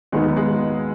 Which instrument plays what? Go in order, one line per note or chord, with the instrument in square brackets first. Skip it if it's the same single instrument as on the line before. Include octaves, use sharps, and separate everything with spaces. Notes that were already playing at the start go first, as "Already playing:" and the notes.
[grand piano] D#2 D#3 F#3 B3 D#4 [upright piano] G#3
[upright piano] G#3